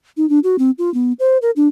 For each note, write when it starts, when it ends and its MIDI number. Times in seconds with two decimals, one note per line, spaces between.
0.17 0.28 63
0.29 0.39 62
0.44 0.56 66
0.59 0.71 60
0.78 0.92 65
0.94 1.13 59
1.19 1.38 72
1.42 1.51 70
1.56 1.68 62